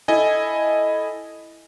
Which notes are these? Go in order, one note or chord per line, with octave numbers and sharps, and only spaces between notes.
E4 A4 D#5 G#5